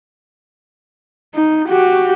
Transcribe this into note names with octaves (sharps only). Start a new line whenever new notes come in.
D#4
F#4 G4